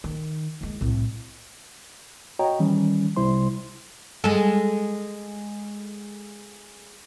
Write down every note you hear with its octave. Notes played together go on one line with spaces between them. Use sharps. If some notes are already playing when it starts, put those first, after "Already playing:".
D#3
D#3 G#3
C2 A2
F#4 C#5 D#5 G5 A#5
D#3 E3 G3 C#4
C2 C3 G3 E4 C5 C6
G#3 A4